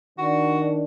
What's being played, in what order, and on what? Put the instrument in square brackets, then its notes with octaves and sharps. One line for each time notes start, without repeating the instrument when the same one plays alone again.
[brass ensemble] D#3 D4 [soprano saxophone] F#4